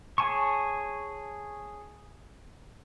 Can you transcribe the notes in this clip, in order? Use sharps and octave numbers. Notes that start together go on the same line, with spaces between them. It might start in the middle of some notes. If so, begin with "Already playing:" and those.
G#4 C#5 G#5 A5 C#6